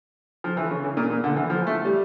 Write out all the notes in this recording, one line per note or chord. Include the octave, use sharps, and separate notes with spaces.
F3
E3
C#3
C#3
A#2
A#2
D3
E3
F3
A3
G3